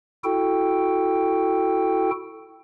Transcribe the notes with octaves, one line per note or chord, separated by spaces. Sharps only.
E4 F#4 A4 G5